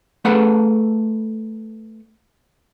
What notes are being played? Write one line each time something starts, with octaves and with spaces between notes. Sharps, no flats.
A3 G#4 A4 B4 F5 F#5